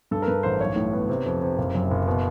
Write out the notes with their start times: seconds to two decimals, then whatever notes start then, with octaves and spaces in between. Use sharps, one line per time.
0.11 G2 A4
0.22 A#4
0.27 G2 B4
0.43 A1 C5
0.60 B1 C#5
0.76 A2
0.93 B3
1.09 C3
1.26 F2
1.42 C3
1.58 F#1
1.75 F#2
1.91 F#1
2.07 B2